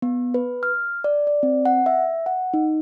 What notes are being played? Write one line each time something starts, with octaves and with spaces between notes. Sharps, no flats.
B3
B4
F6
D5
D5
C4
F#5
E5
F#5
D#4